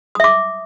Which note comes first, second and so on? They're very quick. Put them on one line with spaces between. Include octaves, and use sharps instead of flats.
D#6 E5 D6